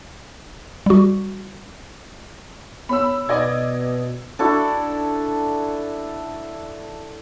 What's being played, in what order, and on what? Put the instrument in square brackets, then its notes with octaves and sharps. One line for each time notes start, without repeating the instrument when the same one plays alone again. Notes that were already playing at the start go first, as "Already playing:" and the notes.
[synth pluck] G3 F#4
[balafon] B3 C#5 [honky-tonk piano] B5 E6
[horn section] B2 [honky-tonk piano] D5 D#5 G#6
[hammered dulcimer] D4 E4 F#4 A4